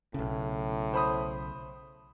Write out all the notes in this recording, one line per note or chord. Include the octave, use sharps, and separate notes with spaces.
B1 A2 C#3
C5 B5 D#6